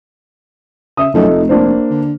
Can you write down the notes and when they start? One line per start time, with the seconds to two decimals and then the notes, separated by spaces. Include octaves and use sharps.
0.97 C#3 E5 D#6
1.14 F#2 F3 A3 D#4
1.29 F1
1.49 A#3 D4 C5
1.90 D3